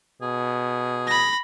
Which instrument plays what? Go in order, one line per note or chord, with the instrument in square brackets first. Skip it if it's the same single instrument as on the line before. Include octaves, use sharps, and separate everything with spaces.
[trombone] B2 [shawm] G#4
[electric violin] B5 A#6